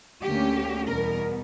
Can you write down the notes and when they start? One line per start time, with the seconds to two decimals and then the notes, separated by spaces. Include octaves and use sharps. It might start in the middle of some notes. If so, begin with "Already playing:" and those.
0.25 D2 D3 A#3 C#4 G4
0.88 E2 B2 G3 B3 A#4